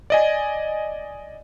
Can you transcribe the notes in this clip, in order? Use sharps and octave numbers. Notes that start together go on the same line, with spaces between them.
D5 D#5 G#5